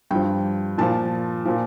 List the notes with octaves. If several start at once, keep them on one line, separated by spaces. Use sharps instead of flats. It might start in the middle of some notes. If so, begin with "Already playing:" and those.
G2 F3 G5
A#2 F3 A5
A#2 F3